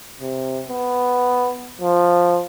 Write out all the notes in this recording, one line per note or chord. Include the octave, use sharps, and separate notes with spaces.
C3
B3
F3